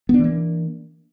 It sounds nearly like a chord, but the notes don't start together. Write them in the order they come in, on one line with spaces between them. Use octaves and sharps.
B3 D4 E3 A#3